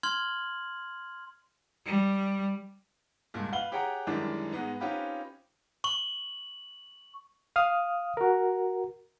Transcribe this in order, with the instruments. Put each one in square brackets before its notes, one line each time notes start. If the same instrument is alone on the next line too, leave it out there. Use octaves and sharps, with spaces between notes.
[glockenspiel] C6 F6 G#6 F#7
[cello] G3
[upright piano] C#2 G2 A#2
B4 F5 F#7 G7
G4 G#4 C#5 F#5 G5 A#5
F#2 D#3 E3 G3 G#3 D4
G#2 G#3 B3 D#4
C4 C#4 D#4 F4 G4 B4
[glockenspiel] C#6 F#7
[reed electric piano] F5 D#6 F6
F#4 A#4